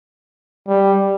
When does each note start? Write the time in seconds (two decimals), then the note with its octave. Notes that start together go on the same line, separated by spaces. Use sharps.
0.67 G3